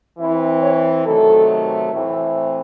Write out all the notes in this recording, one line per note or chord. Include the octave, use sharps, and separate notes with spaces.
E3 C4 E4
C#5
C3 D#3 F#3 A3 A4
A2 E3 C4